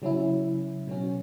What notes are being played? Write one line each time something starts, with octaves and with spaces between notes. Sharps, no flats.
C#3 F#3 C#4 E4
B2 F#3 C#4